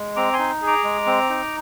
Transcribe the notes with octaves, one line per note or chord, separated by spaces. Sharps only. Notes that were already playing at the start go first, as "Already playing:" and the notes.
Already playing: G#3
C4 A#5 D6
G#5 C6
D#4
G#4
A#5 D6
G#3
C4
D#4